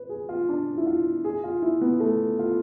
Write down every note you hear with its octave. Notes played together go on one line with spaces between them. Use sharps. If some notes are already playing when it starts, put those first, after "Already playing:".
Already playing: B4
G#4
F4
D4
E4
F4
G#4
F4
E4
B3
A3
F4